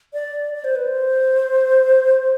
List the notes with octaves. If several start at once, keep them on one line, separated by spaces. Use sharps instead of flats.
D5
D5
C5
B4
C5